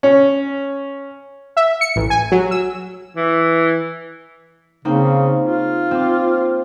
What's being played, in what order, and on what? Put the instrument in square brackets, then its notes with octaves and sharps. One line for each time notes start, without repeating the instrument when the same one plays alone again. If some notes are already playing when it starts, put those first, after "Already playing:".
[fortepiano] C#4
[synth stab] E5
C#7
A1
G#5
F#3
E6
[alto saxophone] E3
[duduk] C#3 [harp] A#3 C4 D#4
[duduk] F4
[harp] C4 D6